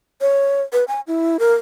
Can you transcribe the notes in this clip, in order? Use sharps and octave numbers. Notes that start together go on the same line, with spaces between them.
C#5
B4
G#5
E4
A#4